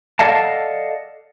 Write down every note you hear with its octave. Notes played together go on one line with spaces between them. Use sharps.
A4 D5 D#5 F5 F#5 A5